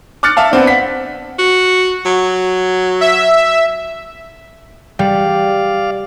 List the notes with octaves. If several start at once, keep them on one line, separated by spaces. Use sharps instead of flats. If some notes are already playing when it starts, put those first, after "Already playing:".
D6 F6 F#6 A6 C#7
E5 F5 A5
B3 C4 D4
F#5 B6
F#4
F#3
E5
G3 D5 F5